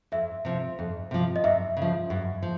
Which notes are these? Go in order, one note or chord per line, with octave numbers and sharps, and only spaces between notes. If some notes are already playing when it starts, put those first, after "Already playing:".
F2 E5
C3 F3
F2
C3 F3
D#5
F#2 E5
C#3
F3
F#2
F3